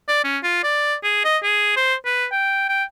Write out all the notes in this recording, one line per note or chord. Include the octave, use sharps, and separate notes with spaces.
D5
C#4
F4
D5
G#4
D#5
G#4
C5
B4
G5
G5